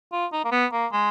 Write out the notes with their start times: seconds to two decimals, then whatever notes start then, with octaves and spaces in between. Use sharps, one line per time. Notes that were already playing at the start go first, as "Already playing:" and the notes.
0.12 F4
0.32 D#4
0.45 A#3
0.51 B3
0.72 A#3
0.92 G#3